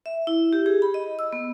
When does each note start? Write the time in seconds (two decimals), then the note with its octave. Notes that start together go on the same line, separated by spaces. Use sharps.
0.06 E5
0.27 E4
0.53 G4
0.66 G#4
0.82 B5
0.94 D#5
1.19 E6
1.33 B3